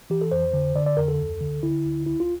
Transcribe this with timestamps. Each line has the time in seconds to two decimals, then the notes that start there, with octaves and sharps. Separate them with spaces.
0.10 E3 G4
0.21 A4
0.31 F2 C5
0.53 D3
0.75 D3 D5
0.86 D5
0.97 F2 A#4
1.08 A4
1.19 D2
1.41 D3
1.63 D3 E4
1.85 D2
2.06 C2 E4
2.20 F4